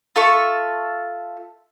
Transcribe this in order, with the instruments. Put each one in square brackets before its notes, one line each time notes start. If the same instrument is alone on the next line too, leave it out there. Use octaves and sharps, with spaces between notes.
[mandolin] F4 A4 E5 C#6